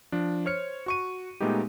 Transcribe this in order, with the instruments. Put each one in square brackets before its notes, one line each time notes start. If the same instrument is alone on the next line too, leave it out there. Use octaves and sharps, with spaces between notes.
[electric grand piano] F3 D4
C5 C#5 F6 C#7
F#4 C#6 D#7
A#2 G#3 A3 B3 D#4 G4